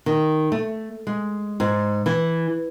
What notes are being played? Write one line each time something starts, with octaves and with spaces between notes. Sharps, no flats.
D#3
A3
G#3
G#2
E3